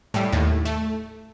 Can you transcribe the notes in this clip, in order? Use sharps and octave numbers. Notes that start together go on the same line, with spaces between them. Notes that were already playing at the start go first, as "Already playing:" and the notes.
A2 G3
D#2 A2
A3